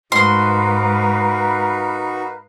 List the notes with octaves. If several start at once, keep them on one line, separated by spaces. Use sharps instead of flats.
G#2 G#3 D#4 F#4 A#4 B4 F5 C6